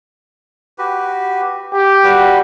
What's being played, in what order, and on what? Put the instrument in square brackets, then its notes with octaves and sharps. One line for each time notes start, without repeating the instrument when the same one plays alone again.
[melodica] F#4 G4 B4
[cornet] G4 [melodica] G5
[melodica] G3 F#4 B4